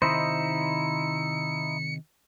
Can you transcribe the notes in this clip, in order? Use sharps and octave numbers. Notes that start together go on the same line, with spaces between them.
C3 D#3 D#4 E4 C5 D#5 C#7